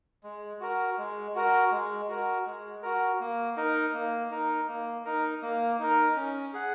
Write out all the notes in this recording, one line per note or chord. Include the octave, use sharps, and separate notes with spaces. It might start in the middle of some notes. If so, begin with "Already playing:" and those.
G#3
F#4 A#4
G#3
F#4 A#4
G#3
F#4 A#4
G#3
F#4 A#4
A#3
D#4 A#4
A#3
D#4 A#4
A#3
D#4 A#4
A#3
D#4 A#4
C#4
G#4 F#5